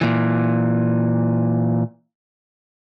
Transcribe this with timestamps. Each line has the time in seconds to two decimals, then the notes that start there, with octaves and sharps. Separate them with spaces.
0.01 A#2 E3